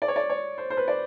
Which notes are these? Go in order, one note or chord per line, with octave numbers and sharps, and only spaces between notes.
D5
C#5
D5
C#5
C5
C5
B4
D5